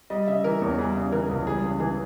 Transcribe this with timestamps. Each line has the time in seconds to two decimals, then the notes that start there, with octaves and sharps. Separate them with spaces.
0.10 G3 D#5
0.28 C#3 E5
0.44 E3 A#4
0.61 E2 C#5
0.79 G3 G#4
0.95 C#3
1.12 E3 A#4
1.29 C#2
1.47 G3 G#4
1.64 C#3
1.80 E3 G#4